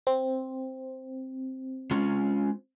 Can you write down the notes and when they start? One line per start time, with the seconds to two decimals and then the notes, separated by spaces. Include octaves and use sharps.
0.07 C4
1.91 G#3 C#4 F4